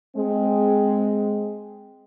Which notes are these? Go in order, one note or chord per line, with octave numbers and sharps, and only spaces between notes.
G#3 C4